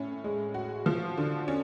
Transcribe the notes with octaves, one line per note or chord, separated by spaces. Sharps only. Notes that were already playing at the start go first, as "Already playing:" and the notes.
Already playing: A2 C#4
G#3
F#4
F3
D3
C#4